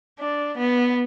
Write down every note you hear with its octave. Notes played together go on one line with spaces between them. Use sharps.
D4
B3